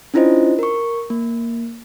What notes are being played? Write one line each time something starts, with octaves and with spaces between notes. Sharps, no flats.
C#4 D4 E4 F4 C5 D#5
A#4 C#6
A#3